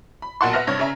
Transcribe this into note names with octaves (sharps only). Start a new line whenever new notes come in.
B5
B1 A#2 F#4 F#5 A5 C6
B4 E5 F#5 F6 A#6
G2 C3 C#5 G#6
C#3 C#4 E5 A#5